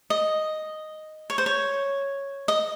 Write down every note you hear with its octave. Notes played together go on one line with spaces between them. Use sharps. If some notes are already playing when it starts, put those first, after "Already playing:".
D#5
C#5
C5
C#5
D#5